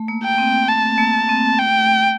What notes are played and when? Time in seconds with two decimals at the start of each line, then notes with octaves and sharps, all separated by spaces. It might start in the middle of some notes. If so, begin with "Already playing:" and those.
Already playing: A3
0.08 A#3
0.24 G5
0.38 C4
0.68 A3 A5
0.98 A#3
1.29 C4
1.59 A3 G5